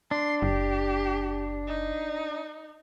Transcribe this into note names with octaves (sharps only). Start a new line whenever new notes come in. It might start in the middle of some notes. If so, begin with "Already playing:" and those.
D4 C6
F#1 G4
D#4